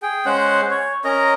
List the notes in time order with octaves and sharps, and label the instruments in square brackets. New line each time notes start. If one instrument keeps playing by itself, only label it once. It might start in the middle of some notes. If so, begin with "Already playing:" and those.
[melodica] G#4 G5
G#3 C#4 C5 F#5
C#5
C#4 A#4 D#5 A#5